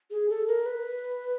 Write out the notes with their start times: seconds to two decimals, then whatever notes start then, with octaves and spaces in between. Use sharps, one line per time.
0.11 G#4
0.30 A4
0.48 A#4
0.66 B4